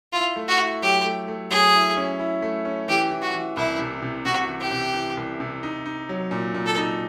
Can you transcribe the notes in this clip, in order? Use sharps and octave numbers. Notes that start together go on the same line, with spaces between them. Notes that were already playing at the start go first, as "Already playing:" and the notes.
E4 F4
A3
F#4
E4
F#3 G4
A3
A3
F#3 G#4
E4
C#4
E4
A3
C#4
E3 G4
E3
F#4
E3
C2 E4
C3
C3
C3 F#4
E3
G4
C3
E3
C2
C3
D#4
D#4
F#3
A#2
A#2
A4
D#4